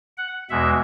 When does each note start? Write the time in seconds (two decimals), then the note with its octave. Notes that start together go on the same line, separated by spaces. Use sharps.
0.18 F#5
0.50 E2 B2 G#3 E5